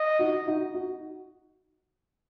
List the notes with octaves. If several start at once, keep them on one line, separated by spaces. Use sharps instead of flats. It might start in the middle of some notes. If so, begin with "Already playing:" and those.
Already playing: D#5
D#4 F#4
D#4 F#4
D#4 F#4